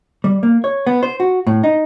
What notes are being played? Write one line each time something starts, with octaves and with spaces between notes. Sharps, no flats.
G3
A#3
C#5
B3
C5
F#4
A2
D#4